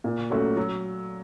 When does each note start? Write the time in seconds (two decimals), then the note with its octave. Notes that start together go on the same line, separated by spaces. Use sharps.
0.04 A#2
0.30 F#3 A3 C#4 F#4
0.57 F#3